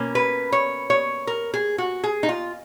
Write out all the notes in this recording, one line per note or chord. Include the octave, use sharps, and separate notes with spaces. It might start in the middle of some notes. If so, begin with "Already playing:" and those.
Already playing: B2 A#3 C#4
B4
C#5
C#5
A#4
G#4
F#4
G#4
D#4
F4